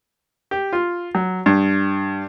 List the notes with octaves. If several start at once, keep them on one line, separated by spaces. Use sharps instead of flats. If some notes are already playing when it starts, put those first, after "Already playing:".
G4
F4
F#3
G2